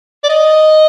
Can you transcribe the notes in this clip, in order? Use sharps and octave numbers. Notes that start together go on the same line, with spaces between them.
D5
D#5